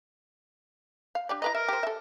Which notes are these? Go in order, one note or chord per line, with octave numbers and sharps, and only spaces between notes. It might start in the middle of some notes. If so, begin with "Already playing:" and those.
F5
D4 G4 D5
E4 B4 D#5 A#5
A#4 E5
G4 C5
A4 E5